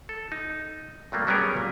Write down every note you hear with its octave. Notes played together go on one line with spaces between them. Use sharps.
A4
D#4
G2 F#3 A3 A#3
F#3 G3 B3 C#4 G#4 A#4
A#2